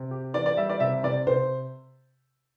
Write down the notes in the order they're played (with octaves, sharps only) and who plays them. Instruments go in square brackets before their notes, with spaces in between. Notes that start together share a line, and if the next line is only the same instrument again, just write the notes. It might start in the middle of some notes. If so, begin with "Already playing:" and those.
Already playing: [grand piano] C3
G4
[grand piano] E3 [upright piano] D5
[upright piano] D5
[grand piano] G3 [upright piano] E5
[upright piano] D5
[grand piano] C3 [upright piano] E5
[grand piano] C3 [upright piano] D5
[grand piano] C3 [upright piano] C5